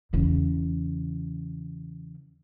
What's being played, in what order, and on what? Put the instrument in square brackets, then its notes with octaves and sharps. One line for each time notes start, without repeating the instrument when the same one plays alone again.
[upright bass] E2 C#3